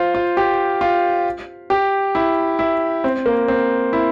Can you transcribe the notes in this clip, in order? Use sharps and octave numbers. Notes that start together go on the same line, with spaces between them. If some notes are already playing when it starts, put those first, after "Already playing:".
Already playing: F4 C5
F4
G4
F4
G4
E4
E4
C4
A#3
C4
E4